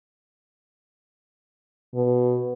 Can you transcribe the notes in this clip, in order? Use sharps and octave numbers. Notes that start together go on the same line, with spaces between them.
B2